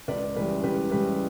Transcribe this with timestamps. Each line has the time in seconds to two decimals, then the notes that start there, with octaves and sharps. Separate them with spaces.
0.08 C#2 B4 D5
0.36 C#3 E3 G3 B4 D5
0.63 C#2 G4 B4
0.91 C#3 E3 G3 G4 B4